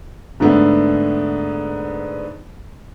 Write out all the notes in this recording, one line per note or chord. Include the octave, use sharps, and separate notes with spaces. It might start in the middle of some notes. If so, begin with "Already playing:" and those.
G#2 D3 A3 B3 D4